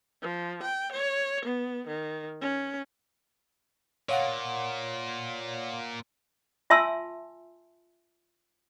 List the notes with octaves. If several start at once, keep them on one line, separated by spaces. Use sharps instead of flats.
F3
G5
C#5
B3
D#3
C#4
A#2 C#5 F5 F#5
F4 E5 G#5 A5 C6 E6